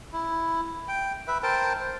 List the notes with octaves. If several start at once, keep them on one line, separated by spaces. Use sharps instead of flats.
E4
G5
B4 E5
A#4 C5 G5 A5
C5